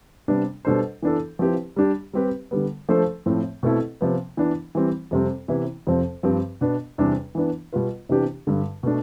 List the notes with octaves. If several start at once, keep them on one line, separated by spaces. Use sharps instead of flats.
C3 G3 B3 D4
B2 G3 D4 A4 C5
E3 B3 D4 A4
F3 C4 E4 G4 B4
G3 D4 G4
G3 C4 G4 B4
D3 G3 B3
F3 A3 D4 A4 C5
A2 F3 C4
B2 A3 C4 E4 A4
C3 F3 B3
E3 B3 D4
E3 G3 C4
F2 C3 G3 C4
C3 E3 B3 E4
F2 C3 F3 C4
G2 F3 C4 G4 B4
B2 B3 D4
E2 C3 G3 D4
E3 B3 D4
B2 G3 B3 F4 B4
C3 E3 B3 D4 G4
G2 D3 G3
B2 A3 D4